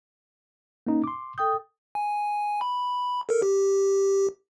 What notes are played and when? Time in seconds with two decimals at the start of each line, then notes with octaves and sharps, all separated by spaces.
0.87 A#3 C#4 D#4
1.04 C6 D6
1.38 A4 G5 D#6 G6
1.95 G#5
2.61 B5
3.29 A4 A#4
3.42 G4